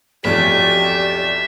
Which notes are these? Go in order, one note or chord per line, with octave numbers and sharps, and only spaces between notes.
B1 F2 G4 D5 E5